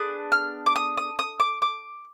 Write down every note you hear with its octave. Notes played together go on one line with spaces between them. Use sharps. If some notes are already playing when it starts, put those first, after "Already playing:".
Already playing: B3 D4 G#4 D#6
F6
D6
D#6
D#6
D#6
D6
D6